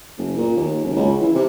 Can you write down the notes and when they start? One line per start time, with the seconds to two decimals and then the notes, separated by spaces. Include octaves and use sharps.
0.18 F#1
0.37 A#2
0.56 D#2
0.84 F#1
0.96 C#2
1.20 E3
1.35 C3